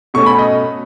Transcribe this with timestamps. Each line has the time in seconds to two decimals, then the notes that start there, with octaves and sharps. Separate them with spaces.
0.14 B2 A3 C#4 C#6
0.26 B5
0.38 D#5